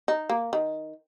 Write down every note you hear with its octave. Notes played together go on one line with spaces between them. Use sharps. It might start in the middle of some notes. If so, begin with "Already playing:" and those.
D#4
A#3
D#3